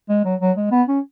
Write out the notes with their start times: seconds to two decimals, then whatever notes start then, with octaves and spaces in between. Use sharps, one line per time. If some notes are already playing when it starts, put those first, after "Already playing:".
0.09 G#3
0.25 F#3
0.41 F#3
0.57 G#3
0.72 B3
0.88 C#4